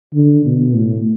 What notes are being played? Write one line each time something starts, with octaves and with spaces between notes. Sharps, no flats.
D3
B2
A2